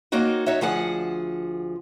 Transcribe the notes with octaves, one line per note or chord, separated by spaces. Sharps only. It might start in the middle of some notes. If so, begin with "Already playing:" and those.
A#3 C4 D#4 F#4 C#5
D#4 F#4 C#5 E5
D2 F3 G#4 F#5